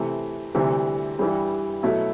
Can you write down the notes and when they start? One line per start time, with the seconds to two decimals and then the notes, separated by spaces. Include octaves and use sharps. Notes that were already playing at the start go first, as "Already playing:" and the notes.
Already playing: C3 E3 A3
0.55 D2 C3 E3 G3
1.19 G2 E3 G3
1.83 B2 F#3 A3 E4